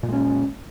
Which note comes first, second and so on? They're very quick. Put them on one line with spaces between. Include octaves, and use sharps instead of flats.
A#2 G#3 C#4